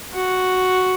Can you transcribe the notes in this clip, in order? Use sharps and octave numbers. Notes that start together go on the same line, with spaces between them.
F#4